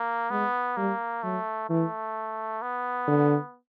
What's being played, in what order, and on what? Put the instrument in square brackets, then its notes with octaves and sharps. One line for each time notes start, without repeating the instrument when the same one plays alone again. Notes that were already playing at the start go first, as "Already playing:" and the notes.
Already playing: [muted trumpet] A#3
[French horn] G#3 [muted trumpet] B3
[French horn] G3 [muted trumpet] A#3
[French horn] F#3 [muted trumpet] A3
[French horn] E3 [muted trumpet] A3
[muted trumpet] B3
[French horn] D3